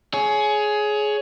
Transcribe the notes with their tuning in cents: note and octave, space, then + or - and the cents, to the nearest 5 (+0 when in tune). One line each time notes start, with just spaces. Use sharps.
G#4 +20 C#5 +15